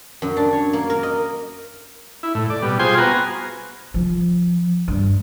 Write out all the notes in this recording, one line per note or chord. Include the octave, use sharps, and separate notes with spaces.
F#2
D4
C#5
A#3
A#4
D#5
E4
A2
D5
B2 G3
F4 G#4 C5 G5 G#5 C6
B3 F#4 G#5 A#5
F3
G2